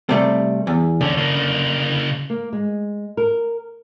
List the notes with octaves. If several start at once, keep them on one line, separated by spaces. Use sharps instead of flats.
C3 G3 A3
E2
D#2 D3 C#4
C#3 A#3
A#3
G#3
A#4